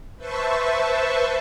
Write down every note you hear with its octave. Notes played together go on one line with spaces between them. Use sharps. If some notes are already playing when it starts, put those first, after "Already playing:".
B4 C5 E5 A5 C#6